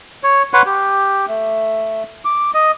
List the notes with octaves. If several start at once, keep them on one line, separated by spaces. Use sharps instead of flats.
C#5
B4 C#5 F#5 C6
G4
A3
D6
D#5